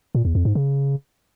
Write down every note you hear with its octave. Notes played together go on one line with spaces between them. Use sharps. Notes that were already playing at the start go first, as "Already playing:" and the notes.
A#2
E2
F2
G#2
C#3